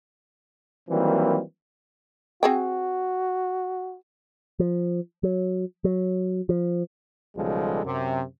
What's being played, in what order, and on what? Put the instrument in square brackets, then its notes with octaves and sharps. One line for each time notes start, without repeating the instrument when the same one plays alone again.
[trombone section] D#3 E3 F#3 G3 A#3 C4
[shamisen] C4 G#4 G5 [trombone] F#4
[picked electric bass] F3
F#3
F#3
F3
[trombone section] B1 C#3 F3 G3 G#3 A4
F#2 C3